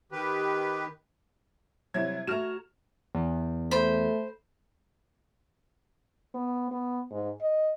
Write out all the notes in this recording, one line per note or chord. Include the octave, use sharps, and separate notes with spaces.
D#3 G4 B4
C3 F#3 E4 G#6
A3 F#4 A#5 F6 E7
E2
A3 C5 B5
B3
B3
G#2
D#5